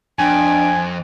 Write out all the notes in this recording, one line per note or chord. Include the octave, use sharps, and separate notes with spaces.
F2 D4 G5 G#5